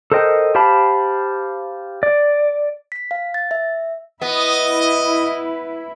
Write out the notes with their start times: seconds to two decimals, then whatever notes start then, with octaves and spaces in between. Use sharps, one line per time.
0.12 A4 A#4 C5 D#5 G5
0.55 G4 C5 F5 A5 B5
2.03 D5
2.92 B6
3.11 F5
3.34 A6
3.51 E5
4.22 B3 E4 D#5